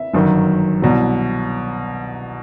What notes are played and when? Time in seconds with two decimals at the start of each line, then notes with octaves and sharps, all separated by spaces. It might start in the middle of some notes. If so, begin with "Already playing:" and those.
Already playing: E5
0.14 G1 F#2 D#3 F#3
0.82 C2 B2 F#3